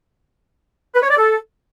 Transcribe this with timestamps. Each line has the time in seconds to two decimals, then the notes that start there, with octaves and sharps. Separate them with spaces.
0.96 B4
1.03 C#5
1.11 D5
1.18 A4